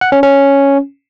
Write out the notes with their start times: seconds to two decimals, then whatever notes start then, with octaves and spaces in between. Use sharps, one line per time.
0.01 F#5
0.12 C#4
0.23 C#4